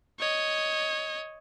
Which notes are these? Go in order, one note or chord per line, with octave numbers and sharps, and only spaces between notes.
C#5 D#5